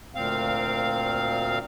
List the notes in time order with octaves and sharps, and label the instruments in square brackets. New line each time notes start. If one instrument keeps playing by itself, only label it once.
[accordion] D2 A#2 C4 F5